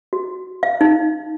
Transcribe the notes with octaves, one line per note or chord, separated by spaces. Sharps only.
F#4
F5
D#4